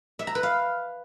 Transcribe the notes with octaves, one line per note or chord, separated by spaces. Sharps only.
E5
A#5
B4
F5